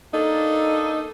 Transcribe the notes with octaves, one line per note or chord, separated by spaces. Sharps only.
A#3 D4 D#4 A4